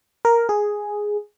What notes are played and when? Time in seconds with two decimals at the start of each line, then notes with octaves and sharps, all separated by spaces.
0.25 A#4
0.49 G#4